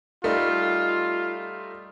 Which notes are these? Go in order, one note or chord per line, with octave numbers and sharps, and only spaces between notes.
G3 A3 D#4 F4